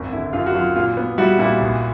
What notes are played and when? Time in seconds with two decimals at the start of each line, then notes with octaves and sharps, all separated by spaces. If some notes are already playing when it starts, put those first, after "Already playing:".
Already playing: G#1 F#2
0.12 D3 E4
0.33 F#2 F4
0.46 F#4
0.55 F#3 F4
0.76 A#2 F4
0.97 B3
1.18 G3 E4 F#4
1.39 A#2 E4 F#4
1.61 A#1